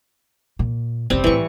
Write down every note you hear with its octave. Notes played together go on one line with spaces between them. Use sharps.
A#2
F#1 C#3 G3 C4
A2 D#3 E3 C#6